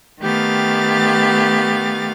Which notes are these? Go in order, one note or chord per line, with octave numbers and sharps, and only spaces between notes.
D#3 A3 B3 G4 F5 A6